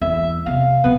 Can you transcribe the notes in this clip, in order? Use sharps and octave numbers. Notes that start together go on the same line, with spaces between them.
E2 E5
C3 B3 F5
B2 A3 B3